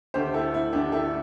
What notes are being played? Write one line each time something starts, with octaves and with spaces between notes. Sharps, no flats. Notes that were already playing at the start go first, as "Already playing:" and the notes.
D2 D3 A3 G4 C5
E4 A4
E4
D2 D3 A3 D4 G4
E4 A4